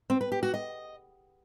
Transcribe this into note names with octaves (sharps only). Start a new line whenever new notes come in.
C4
B4
G4
F#4
D#5